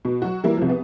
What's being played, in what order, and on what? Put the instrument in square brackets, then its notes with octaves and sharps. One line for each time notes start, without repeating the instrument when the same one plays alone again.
[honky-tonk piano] B2
F#3 F#4
E3 G3 A#3 E4
C2 F3
B3